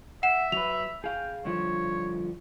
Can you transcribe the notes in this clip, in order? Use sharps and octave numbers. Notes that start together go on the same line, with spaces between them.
E5 F#5 E7
F#3 B4 F7
G#4 F5 G5
G2 D3 F3 C#5